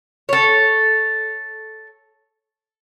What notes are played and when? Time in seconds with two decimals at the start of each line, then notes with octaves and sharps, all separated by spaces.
0.29 A4 C#5